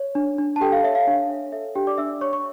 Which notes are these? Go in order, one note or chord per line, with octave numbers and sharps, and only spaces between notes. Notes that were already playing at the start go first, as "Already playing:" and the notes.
Already playing: C#5
D4
D4
A5
G4 A4 G5
F5
C#5 E5
F5
D4
C#5
A4 E5
D4 G4 G5
D5 D6
D4 E5 E6
C#5 C#6
C#6